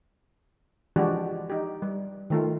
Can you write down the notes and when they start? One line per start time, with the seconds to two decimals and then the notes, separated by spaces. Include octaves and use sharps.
0.96 E3 F3 G#3 D4 F#4 G4
1.50 D#4 G4
1.82 G3
2.30 D#3 A3 F4